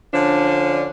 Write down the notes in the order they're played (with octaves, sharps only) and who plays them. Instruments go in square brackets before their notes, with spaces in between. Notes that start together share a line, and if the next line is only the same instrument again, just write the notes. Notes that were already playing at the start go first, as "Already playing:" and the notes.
[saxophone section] D3 F3 C#4 D4